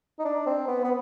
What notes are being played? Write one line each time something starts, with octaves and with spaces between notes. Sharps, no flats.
D#4
D4
C4
B3
B3